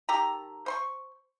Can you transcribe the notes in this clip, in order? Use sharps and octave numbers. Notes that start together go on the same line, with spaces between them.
D#3 G4 A4 A#5
C5 C6 C#6